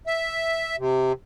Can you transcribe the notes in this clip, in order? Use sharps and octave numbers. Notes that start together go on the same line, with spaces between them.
E5
C3